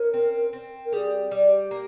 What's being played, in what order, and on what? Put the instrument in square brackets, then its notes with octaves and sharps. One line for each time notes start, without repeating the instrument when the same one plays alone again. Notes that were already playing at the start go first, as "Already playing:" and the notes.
Already playing: [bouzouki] C#4 [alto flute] A#4
[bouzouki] C4
C4
[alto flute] A#4
[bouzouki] G3 [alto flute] G#4
[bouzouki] G3
[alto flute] G4
[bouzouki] A#3